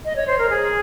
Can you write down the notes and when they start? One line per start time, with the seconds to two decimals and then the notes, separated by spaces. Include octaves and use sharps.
0.05 D#5
0.16 C#5
0.28 C5
0.39 A#4
0.50 G#4